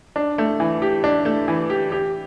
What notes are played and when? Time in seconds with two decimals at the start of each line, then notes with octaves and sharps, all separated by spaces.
0.16 D4
0.38 A3
0.60 E3
0.82 G4
1.04 D4
1.25 A3
1.48 E3
1.70 G4
1.92 G4